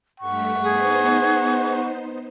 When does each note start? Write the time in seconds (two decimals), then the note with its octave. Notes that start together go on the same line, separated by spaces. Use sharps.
0.20 G2 A3 F#5 C#6 B6
0.63 B3 D#4 G#4 C5